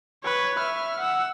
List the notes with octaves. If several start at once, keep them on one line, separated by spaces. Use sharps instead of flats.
B4 C#5
E5 F6
F#5 E6